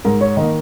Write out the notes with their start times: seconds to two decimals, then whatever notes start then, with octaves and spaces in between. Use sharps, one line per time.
0.05 G#2 A#4
0.21 C#5
0.37 D#3 A#3 D#5